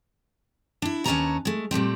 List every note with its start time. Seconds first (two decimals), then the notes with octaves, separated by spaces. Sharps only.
0.82 D4 E4
1.05 D#2 C#4 B4 C#5 A5 A#5
1.45 G#3 A3
1.71 A#2 G3 A3 C4